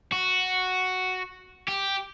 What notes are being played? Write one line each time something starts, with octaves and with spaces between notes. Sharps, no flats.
F#4
G4